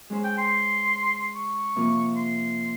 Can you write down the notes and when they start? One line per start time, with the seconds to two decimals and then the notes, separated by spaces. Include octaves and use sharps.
0.10 G#3 C#4 G#4 C5
0.24 G5
0.38 C6
1.35 C#6
1.76 C3 F3 A#3 F4
2.17 C6